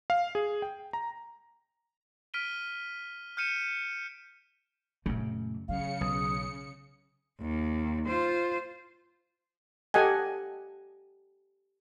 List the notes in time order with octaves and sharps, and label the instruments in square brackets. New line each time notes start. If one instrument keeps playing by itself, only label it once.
[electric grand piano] F5
G#4
G5
A#5
[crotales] F6 B6 D7 D#7 G7
F6 G6 C#7 D#7 E7
[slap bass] F#2 C#3 [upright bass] A#2 A3
[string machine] C#3 C#7 [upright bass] F#3 [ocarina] F5
[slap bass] B1 [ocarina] D#6
[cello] D#2
F4 C5
[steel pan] G4 A4 D#5 F#5 G#5